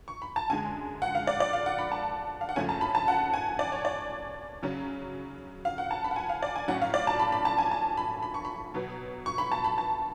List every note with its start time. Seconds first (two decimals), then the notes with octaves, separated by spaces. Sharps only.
0.08 C#6
0.22 B5
0.36 A5
0.49 F#2 D3 G#3 G#5
1.02 F#5
1.15 F5
1.27 D5
1.40 D5
1.53 F5
1.66 F#5
1.79 B5
1.92 A5
2.41 F5
2.49 F#5
2.56 F#2 C#3 F3 A3 C#4 G#5
2.69 A5
2.81 B5
2.95 A5
3.08 F#5
3.34 G#5
3.59 D5
3.72 C#5
3.85 D5
4.62 C#3 F#3 C#4
5.65 F5
5.78 F#5
5.91 A5
6.04 B5
6.11 F#5
6.16 G#5
6.29 F5
6.43 D5
6.56 G#5
6.68 A2 F#3 C#4 F#5
6.82 F5
6.94 D5
7.07 A5
7.20 B5
7.32 B5
7.45 A5
7.58 G#5
7.71 A5
7.97 B5
8.23 B5
8.34 C#6
8.45 B5
8.74 B2 F#3 B3
9.26 C#6
9.38 B5
9.52 A5
9.64 B5
9.78 A5